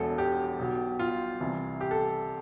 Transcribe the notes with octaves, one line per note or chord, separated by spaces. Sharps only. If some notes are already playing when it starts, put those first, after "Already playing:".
Already playing: E1 E2 B2 A4
G4
B1 B2
F4
C2 C3 E3
G4
A4